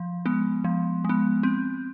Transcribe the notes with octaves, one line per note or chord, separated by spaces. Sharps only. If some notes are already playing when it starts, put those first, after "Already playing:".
Already playing: F3
G#3 B3
F3
G#3 B3
C4